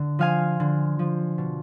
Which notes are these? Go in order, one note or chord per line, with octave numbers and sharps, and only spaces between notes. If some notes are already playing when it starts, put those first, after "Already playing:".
Already playing: D3
F3 F5 G#5
D3
F3
B2